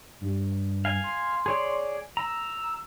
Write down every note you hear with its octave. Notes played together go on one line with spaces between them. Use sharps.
G2
F5 G#5
C6
G#4 C#5 D5
A#5 E6